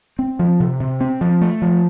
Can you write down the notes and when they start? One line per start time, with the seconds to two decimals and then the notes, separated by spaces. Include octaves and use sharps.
0.19 C4
0.39 F3
0.60 C3
0.80 C3
1.01 C4
1.21 F3
1.41 A3
1.62 F3